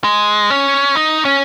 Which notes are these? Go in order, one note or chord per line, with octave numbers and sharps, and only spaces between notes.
G#3
C#4
D#4
C#4